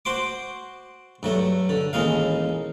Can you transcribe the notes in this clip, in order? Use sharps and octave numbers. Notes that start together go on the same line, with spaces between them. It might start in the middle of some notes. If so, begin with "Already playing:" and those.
F#4 C5 C6 D6
G2 F#3 A3
D3
A1 D#2 G#3 D#4 F5